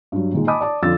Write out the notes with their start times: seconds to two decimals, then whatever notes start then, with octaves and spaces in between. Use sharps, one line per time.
0.12 G2 F#3
0.32 A#2 D#3 G#3
0.47 D#5 G#5 A5 B5 D6 D#6
0.61 D5 A5 D6
0.83 F2 D3 F4 D5 E6 A6